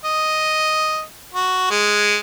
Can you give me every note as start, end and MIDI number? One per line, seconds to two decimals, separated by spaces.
0.05 1.02 75
1.34 1.69 66
1.70 2.17 56